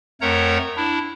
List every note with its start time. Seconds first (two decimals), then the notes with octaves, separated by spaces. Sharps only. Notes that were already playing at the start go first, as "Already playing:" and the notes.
0.21 F2 A3 A#4 C#5 F#5 A#5
0.77 D4 E4